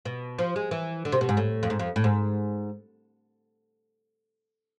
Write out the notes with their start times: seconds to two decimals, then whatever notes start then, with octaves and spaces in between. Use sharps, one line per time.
0.05 B2
0.39 F3
0.56 G#3
0.71 E3
1.05 D3
1.12 C3
1.21 B2
1.29 G#2
1.37 A2
1.63 F2
1.70 G#2
1.79 F2
1.96 A2
2.04 G#2